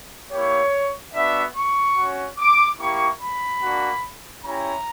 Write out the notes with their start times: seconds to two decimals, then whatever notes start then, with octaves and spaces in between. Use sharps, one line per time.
0.32 A#3 E4 G4 C#5
1.14 B3 D4 F#4 E5
1.55 C#6
1.96 C#4 F#4
2.38 D6
2.79 A#3 E4 G4 C#6
3.20 B5
3.62 A#3 D4 F#4
4.44 C#4 E4 G4 A#5